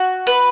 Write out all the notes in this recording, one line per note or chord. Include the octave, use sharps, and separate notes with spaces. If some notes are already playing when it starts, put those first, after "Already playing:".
Already playing: F#4
B4